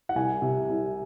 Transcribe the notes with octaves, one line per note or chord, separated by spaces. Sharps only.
F#5
C2 G#5
C3
C2